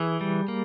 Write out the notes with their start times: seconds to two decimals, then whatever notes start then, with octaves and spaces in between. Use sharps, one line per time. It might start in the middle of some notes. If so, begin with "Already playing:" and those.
Already playing: E3 G#4
0.21 G3
0.48 A#3